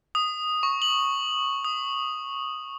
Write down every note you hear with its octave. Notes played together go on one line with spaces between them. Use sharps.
D#6
C#6
F#7
D#6